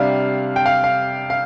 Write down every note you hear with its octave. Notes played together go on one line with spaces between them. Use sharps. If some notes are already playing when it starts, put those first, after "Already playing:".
Already playing: C3 G3 D4 F5
G5
F5
F5
F5